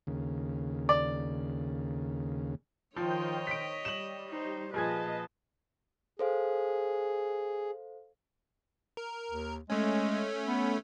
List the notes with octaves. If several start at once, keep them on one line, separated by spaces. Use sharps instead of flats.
D#2 C#3
D5
D#3 F3 C5 C#5 D#5 G5
B6 D7
G3 E7 F#7
D#4 C5
A#2 F3 G#4 B4 D#5 A5 G#6
G#4 A4 C5 F5
A#4
D#2
G#3 A3 C#4
B3